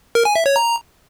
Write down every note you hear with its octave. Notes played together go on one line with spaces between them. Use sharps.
A#4
G#5
E5
C#5
A#5